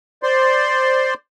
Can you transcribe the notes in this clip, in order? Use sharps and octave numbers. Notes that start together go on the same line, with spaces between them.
C5 D5 C6